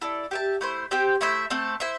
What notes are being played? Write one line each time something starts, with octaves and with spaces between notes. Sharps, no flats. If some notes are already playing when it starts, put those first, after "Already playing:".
E4 A4 D5
G4 E5 A5
A3 E4 C5
C4 G4 C5 G5
A3 E4 C5 E5
A3 C4 A4
E4 C5 E5